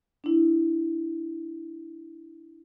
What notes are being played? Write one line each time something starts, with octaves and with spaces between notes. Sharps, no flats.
D4 E4